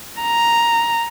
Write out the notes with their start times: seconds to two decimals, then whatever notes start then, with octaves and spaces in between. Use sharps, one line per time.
0.22 A#5